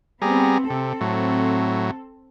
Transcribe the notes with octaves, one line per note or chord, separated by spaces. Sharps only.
G3 B3 C4 G#4 A#5
C3 C4 A4
A2 F#3